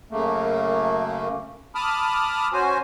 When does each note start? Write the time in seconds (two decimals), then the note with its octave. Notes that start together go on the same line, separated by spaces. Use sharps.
0.11 F#2 C#3 A3 A#3
1.75 A5 B5 D6 D#6 F6
2.53 C#4 F#4 C5 G#5